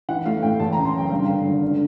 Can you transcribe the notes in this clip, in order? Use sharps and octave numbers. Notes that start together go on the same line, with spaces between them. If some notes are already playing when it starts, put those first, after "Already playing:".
E3 F#5
A3 F5
A2 G5
E2 A5
A#5
C#3
C6
F#1 G5
G2 F5
D3
G#1
D3